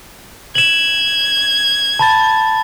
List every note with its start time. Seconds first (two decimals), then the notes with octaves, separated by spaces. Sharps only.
0.55 G#6 E7 F#7
1.99 A5 B5 A6